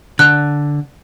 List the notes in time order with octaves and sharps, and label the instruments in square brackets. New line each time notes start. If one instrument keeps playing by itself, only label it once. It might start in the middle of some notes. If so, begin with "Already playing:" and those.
[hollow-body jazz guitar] D3 [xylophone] F#6